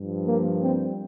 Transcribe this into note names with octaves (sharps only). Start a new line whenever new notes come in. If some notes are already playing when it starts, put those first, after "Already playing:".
Already playing: G2 F3
A#3
C4